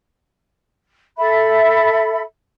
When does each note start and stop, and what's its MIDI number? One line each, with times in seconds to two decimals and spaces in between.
1.17 2.20 69
1.17 2.20 76
1.17 2.20 83